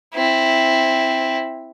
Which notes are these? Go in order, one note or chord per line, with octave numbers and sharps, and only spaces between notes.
C4 E4